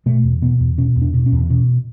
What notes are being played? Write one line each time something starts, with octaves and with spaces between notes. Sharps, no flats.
B2 A3
E2
B2 B3
E2
B2 C#4
E2
D4
B2
C#4
E2
B2 C#4